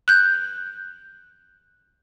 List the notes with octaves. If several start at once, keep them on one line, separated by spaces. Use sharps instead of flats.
F#6 G6